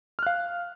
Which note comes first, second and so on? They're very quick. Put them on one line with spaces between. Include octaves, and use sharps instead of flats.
F6 F#6 F5